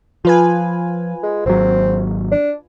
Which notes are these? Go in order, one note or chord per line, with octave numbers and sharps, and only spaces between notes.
F3 F4 B4 G#5
G#3
G#1 F#3 C4
D4